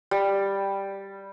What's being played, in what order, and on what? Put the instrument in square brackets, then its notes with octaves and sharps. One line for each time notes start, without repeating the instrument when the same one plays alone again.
[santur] G3